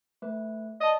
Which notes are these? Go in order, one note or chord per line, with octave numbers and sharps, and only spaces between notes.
A3 B4
D5 D#5 A5